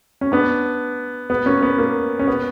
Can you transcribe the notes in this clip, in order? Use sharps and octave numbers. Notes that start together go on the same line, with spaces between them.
C#4
B3 D4
B3
A#3 C#4
B3
A#3
C#4
B3